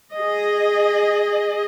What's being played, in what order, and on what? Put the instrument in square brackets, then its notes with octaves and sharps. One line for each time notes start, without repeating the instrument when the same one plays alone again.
[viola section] G#4 D#5